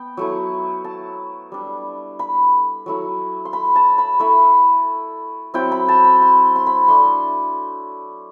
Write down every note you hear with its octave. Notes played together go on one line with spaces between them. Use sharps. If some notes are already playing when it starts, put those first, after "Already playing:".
Already playing: B3 G5
F#3 A3 E4
A5
G3 D4
B5
F#3 A3 E4
C6
B5
A5
B5
A3 E4 B5
F#3 C4 E4 G5
B5
A5
B5
C6
C6
B5
A3 D4 C6